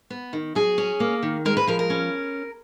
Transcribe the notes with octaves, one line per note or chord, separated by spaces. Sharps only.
B3
D#3
F#3 G#4
C#4
A#3
D#3
G#3 A#4
B4
F3 A#4
A#4
C#4